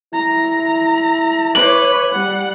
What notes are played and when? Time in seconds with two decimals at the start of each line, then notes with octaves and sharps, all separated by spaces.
0.13 E4 A#5
1.55 B4 C#5 D6 F#7
2.12 G3 F#5